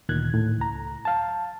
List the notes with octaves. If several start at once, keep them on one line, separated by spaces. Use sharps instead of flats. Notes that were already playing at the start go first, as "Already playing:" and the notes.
D2 A#2 D#3 F#6 G#6
A2
C#2 A#5
F5 A5